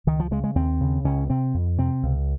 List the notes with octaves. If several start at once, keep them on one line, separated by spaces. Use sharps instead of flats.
C#2 D#3
F3
C#3 G#3
G#3
D#2 C4
C#3
C#2 C#4
C3 C4
F2
C3 C4
C#2